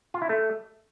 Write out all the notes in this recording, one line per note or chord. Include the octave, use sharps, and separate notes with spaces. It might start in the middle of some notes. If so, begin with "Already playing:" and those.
F4
E4
A3